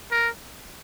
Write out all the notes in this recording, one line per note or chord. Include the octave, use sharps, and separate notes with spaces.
A#4